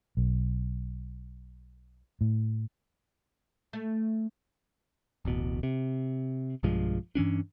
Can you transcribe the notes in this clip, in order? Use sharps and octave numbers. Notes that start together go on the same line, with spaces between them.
B1
A2
A3
D1 A1 B2
C3
B1 G2 F3 G#3
G2 E3 C#4 D4